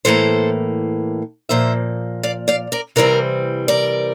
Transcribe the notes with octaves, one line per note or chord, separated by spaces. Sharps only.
A2 E3 A#3 A4 C5
A#2 F3 A#3 C5 E5
D5 F5
D5 F5
A#4 D5
C3 E3 G3 C4 A#4 D5
A#4 D5